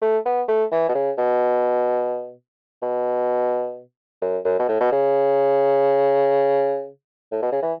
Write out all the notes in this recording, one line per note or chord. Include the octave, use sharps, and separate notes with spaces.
A3
B3
A3
E3
B2
C#3
B2
B2
F#2
F#2
B2
A2
B2
C#3
A2
B2
C#3
E3